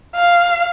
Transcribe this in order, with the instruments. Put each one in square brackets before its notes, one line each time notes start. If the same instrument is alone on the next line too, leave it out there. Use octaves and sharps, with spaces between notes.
[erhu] F5